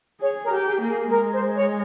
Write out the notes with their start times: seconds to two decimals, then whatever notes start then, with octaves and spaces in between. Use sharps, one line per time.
0.21 G#4 C#5
0.44 A#4
0.50 G4
0.65 G#4
0.81 A#3
0.88 G#4
1.10 G#3 A#4
1.32 C5
1.55 C#5